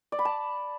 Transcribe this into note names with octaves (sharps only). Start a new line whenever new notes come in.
D5
B5
A5